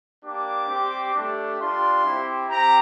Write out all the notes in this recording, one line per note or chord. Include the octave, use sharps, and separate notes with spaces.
A#3 D4 G4 D6
G3 C4 G4
A3 D4 G4
G3 D4 F4 C6
C4 E4 G4
C4 G4 A#5